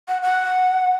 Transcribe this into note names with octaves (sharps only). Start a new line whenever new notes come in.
F#5
F#5